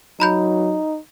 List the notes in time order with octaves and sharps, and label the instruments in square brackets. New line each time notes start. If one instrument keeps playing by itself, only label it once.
[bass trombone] F#3 [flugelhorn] D#4 [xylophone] A#5 B5 G6